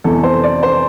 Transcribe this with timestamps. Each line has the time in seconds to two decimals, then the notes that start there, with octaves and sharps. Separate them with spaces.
0.04 F1 E2 E3 A4
0.23 C5
0.43 D5
0.63 C5